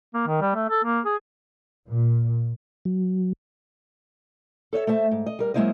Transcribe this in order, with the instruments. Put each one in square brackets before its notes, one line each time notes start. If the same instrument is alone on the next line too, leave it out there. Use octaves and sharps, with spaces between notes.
[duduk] A#3
D#3
G3
A3
A4
A#3
G#4
[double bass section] A#2
[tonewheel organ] F#3
[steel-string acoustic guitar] A4 C#5 D#5 E5
A3 C5 E5 A5
G#2
D#5
G3 A#4
F#3 G#3 A#3 E4 C5 D#5